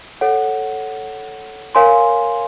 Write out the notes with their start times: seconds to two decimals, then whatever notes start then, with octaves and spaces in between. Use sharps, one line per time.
0.21 A4 C#5 F#5
1.75 A#4 C#5 F5 G#5 C6